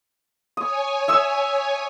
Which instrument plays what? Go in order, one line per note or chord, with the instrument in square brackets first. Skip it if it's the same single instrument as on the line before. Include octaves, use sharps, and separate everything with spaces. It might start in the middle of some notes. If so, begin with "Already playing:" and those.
[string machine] C#5 G#5 [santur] D#6
[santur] E5 D#6 E6